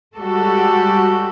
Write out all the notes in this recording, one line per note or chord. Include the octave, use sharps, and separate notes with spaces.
G3 G#3 F#4 G4 A4